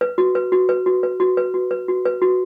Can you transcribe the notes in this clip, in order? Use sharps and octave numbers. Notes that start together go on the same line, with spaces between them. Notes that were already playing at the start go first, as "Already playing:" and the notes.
B4
F#4
B4
F#4
B4
F#4
B4
F#4
B4
F#4
B4
F#4
B4
F#4